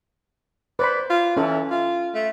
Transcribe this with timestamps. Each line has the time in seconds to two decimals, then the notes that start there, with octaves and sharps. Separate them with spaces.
0.79 B4 C5 D5 B5
1.10 F4
1.37 E3 C#4 A4
1.70 F4
2.14 A3